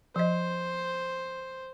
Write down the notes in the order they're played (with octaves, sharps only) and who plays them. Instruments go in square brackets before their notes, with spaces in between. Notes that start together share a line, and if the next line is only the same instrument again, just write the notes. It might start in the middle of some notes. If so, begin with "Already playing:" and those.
[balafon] F3 D#5 [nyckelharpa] C5